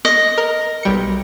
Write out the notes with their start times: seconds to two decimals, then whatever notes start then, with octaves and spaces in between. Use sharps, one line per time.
0.05 D#5
0.38 A#4
0.83 B1 G3 C#7